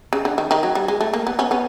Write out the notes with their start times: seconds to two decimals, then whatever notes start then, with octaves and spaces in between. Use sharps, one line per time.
0.13 C#3
0.25 D3
0.38 D#3
0.51 D#3
0.63 F#3
0.75 G3
0.88 G#3
1.01 A3
1.13 A#3
1.27 B3
1.39 B3 C#4
1.51 B3 C#4